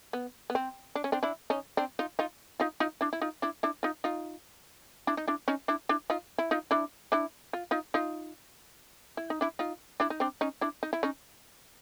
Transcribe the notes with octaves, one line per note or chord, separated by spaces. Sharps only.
B3
B3
C4
D4
C#4
C4 D4
D4 E4
C#4 D#4
C4 D4
D#4 F4
D#4 F4
D#4 F4
D#4 F4
D4 E4
E4
D#4 F4
D4 E4
D4 E4
D#4 F4
D#4 F4
D4 E4
D#4
D4 E4
C#4 D#4
D4 E4
D4 E4
D#4 F4
E4
D#4 F4
D4 E4
D4 E4
F4
D#4 F4
D#4 F4
E4
D#4
D4 E4
D#4 F4
D4 E4
D#4
C4 D4
C#4 D#4
D4 E4
D#4
E4
C#4 D#4